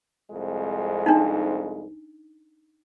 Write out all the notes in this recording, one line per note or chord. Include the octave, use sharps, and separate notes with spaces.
C2 F2 G#3
D4 D#4